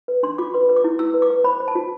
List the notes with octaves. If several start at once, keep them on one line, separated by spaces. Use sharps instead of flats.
B4
D4 C6
F4 D6
B4 C6
B4
D6
E4
E4 E6
B4
D6
B4
C5 B5
C5
A5
F4